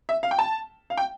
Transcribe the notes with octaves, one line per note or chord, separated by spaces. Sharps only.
E5
F5
G5
A5
F5
G5